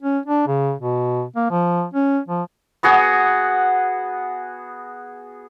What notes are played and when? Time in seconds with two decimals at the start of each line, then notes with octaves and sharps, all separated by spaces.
0.03 C#4
0.26 D4
0.47 C#3
0.78 B2
1.36 A#3
1.51 F3
1.94 C#4
2.28 F3
2.83 B3 F#4 G#4 F#5